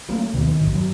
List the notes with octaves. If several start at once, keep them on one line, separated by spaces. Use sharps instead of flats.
F#3 A3 A#3 C#4
D2 B2 D#3 D4
D#3 E3
B1 G#2
G2 F#3